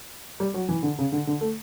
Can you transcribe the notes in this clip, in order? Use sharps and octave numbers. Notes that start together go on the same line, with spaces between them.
G3
F#3
E3
D3
C#3
D3
D3
A3